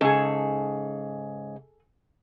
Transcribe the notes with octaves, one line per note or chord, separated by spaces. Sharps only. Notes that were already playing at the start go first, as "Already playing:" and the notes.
G#2 C#3 G#4 A4